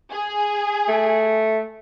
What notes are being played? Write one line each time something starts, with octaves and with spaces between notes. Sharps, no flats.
G#4
A3